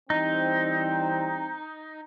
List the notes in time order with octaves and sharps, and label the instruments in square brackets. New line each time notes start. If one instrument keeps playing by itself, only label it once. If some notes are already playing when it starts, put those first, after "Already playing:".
[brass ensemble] E3 G3 C4 [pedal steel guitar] D#4